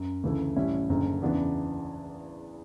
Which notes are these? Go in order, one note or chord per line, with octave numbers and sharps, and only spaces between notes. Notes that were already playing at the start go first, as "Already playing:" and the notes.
Already playing: F#2
D2 C#3 E3 A3
A1 A2 G3 C#4 E4
F#1 F#2 D3
E2 C#3 E3 B3 D4